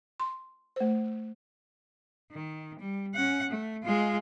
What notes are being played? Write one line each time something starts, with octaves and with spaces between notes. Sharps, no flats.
C6
A3 C5
D#3
G3
C#4 F#5
A3
G#3 F4